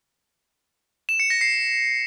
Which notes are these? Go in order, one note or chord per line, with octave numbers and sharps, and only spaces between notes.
E7
C#7
A#6
C7